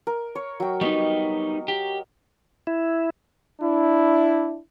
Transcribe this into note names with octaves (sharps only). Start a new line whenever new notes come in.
A#4
C#5
F#3 G5
G3 B3 D#4 D#5 C#6 D6
G4
E4
D4 E4